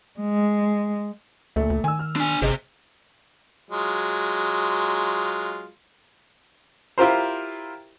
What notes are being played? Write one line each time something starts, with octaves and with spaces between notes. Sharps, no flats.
G#3
D2 A#2 A3
D2
D#3 G#5 E6
F6
D4 G#5
G#1 C3 G#4 D#5
F#3 G#3 F4
E4 F4 G4 A#4 C5